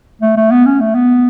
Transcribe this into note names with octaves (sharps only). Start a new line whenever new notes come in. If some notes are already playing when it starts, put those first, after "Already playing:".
A3
A3
B3
C#4
A3
B3